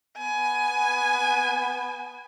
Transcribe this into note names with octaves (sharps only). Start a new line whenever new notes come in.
B3 G#5